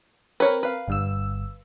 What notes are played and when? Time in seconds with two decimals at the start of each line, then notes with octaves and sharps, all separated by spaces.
0.40 C4 A#4 B4 C#5
0.63 B4 F5
0.88 G1 G2 E6